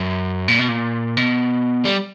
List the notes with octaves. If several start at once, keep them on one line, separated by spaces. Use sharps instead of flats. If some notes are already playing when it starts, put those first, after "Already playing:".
Already playing: F#2
A#2
B2
A#2
B2
G3